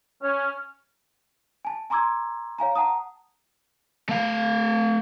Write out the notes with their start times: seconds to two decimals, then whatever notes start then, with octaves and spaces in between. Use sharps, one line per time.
0.22 C#4
1.65 G#5 A5
1.90 G#5 A#5 C6 D6 E6 G#6
2.59 C#5 F5 G#5 A#5
2.75 F#5 A5 A#5 D#6
4.09 A3 F5